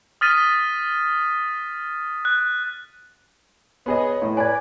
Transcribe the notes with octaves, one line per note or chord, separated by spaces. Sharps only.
D#6 F6 A6 B6 D#7
F#6
B3 G#4 C#5 D#5
A2
B4 D5 G#5 G#6